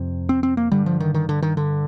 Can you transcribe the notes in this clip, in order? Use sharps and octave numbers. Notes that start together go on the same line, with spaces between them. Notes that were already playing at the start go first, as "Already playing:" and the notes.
Already playing: F2 C3
C4
C4
A#3
G2 D3 G3
F3
D#3
D#3
D3
D#3
D3